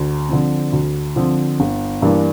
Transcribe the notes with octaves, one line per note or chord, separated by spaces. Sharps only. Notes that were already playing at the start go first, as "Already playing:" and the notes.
Already playing: D2
D3 F3 C4
D2
D3 F3 C4
G1
G2 E3 A#3 D4